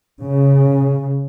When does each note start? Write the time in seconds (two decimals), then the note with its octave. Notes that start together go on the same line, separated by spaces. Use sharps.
0.22 C#3